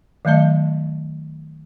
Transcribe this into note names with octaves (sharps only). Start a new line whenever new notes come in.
D#3 F#3 A3 D#5 A5